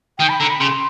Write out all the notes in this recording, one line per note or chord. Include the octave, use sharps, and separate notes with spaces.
D#3 G5
B5
D3 A#5
B5
C#3 C6